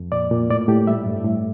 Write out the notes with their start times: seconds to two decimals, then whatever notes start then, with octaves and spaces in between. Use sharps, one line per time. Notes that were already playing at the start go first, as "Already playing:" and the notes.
Already playing: F2
0.12 A#2 D5
0.31 A#2
0.50 A2 D5
0.68 A2 G4
0.87 G3 E5
1.06 G2
1.25 A2